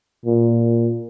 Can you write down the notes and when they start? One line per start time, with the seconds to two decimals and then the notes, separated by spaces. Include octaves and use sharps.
0.26 A#2